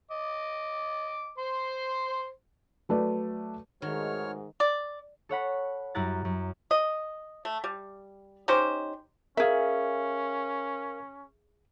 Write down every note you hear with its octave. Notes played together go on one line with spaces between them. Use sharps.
D#5 D6
C5 C6
F#3 A3 B4 D5
G#2 D#3 G#3 A3 F#4 C#5 F6
D5
A4 C#5 F#5 B5
F#2 G3 E4 A#5 F#6 A6
F#2
D#5
A3
G3
C#4 D#4 G4 C5
C#4 G#4 A#4 E5 F5